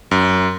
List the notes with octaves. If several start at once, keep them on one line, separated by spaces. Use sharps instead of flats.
F#2